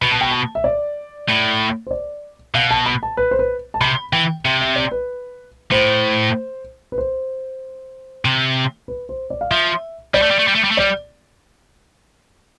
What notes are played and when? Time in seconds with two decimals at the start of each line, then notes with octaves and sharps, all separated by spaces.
0.01 B2 B5
0.11 A5
0.21 G5
0.31 A5
0.55 E5
0.64 D5
1.29 A2
1.87 C5
1.91 D5
2.54 B2 F5
2.71 A5
2.86 B5
3.03 A5
3.17 B4
3.31 C5
3.39 B4
3.74 A5
3.81 C3 B5
4.13 E3 G5
4.44 C3 E5
4.61 E5
4.76 D5
4.91 B4
5.71 A2 C5
6.92 B4
6.98 C5
8.25 C3
8.88 B4
9.09 C5
9.30 D5
9.41 F5
9.51 F3 E5
10.14 G3 D5
10.22 A3
10.31 G3
10.39 A3
10.47 G3
10.55 A3
10.64 G3
10.71 A3
10.77 G3 D5